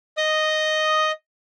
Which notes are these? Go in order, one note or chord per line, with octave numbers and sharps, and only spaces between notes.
D#5 D#6